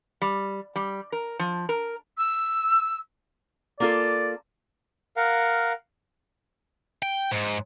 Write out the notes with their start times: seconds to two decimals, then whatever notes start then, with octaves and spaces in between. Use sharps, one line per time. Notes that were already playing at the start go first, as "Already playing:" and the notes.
0.22 G3
0.76 G3
1.12 A#4
1.39 F3
1.69 A#4
2.18 E6
3.80 A#3 F4 A4 D5
5.16 A#4 F5 F#5
7.02 G5
7.32 G#2